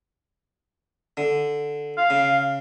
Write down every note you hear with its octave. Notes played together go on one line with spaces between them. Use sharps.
D3
F5
C#3